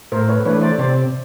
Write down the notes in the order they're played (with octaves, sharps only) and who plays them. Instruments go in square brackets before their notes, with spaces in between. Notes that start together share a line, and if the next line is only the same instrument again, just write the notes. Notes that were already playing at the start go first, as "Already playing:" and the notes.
[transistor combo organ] A2 [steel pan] A#4 C5
[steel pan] B4 C#5
[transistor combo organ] E3 A3 D4 [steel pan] B4 C#5
[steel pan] C5 D5
[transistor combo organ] C3 [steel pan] C5 D5